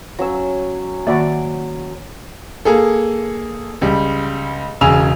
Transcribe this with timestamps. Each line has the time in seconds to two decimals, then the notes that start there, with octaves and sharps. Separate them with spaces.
0.19 F#3 C#4 C#5 E6
1.07 D#3 A#3 F#4 D5 E5
2.65 A#3 G#4 A4
3.82 C#2 G3
4.81 E1 C#3 G#5 E6 F7